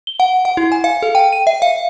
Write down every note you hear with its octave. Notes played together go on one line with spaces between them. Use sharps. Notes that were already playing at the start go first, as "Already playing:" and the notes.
G7
F#5
F#5
E4
G#5
F5
A4
G5
D#7
E5
F5